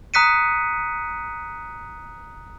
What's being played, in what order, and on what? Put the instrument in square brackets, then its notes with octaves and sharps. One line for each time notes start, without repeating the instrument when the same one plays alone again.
[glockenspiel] A#5 D#6 F#6 B6 C#7 D#7